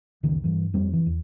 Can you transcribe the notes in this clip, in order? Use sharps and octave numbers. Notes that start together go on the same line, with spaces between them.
F#1 C#2 D#3
G2 E3
F2 G3 C4
E3
E2